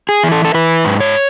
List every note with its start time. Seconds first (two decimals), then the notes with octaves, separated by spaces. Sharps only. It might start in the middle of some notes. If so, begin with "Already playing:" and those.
0.09 G#4
0.24 E3
0.32 A4
0.45 A4
0.54 E3 B4
0.85 G#2
1.00 C#5